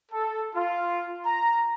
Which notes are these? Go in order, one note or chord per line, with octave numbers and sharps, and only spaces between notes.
A4
F4
A#5